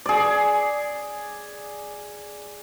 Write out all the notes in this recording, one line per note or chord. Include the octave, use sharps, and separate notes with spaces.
G#4 D5